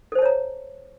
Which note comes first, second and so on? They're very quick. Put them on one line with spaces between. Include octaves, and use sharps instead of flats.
A4 C5 A5 C#5 A#5